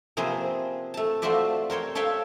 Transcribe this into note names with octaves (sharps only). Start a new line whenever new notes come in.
C3 F3 A#3 C4 G#4 B4
A3 A5
A3 F4 F#4 C5 D5 E5
A#4 C5 C#5 G5
A4 C#5 E5 F5 G5 A5